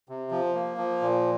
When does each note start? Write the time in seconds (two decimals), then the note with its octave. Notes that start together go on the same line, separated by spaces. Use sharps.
0.09 C3
0.31 F3
0.54 A#3
0.78 F3
1.02 A#2